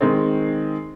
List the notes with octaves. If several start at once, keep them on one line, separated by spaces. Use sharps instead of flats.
D#3 G#3 C4